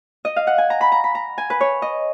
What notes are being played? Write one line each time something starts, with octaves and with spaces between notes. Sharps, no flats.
D#5
F5
F#5
G#5
A#5
B5
A#5
B5
A#5
G#5
B4
C#5
D#5